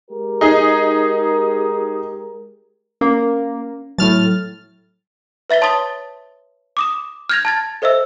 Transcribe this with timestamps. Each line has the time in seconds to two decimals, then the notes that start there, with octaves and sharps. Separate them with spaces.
0.10 G#3 G4 A#4
0.41 D#4 G#4
3.01 A#3 C#4
3.98 A2 F#3 F6 A6
5.50 B4 E5 A6 B6 G7
5.61 C#5 A5 C6 D#6 A6 G7
6.77 D6 D#6 E7
7.29 F6 G6 G#6 A#6 F7
7.45 A5 G#6 A6
7.82 A4 C5 D#5 E5 E6